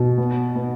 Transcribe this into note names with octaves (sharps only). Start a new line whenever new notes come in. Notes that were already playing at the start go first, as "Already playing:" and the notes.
Already playing: B2
B3
B3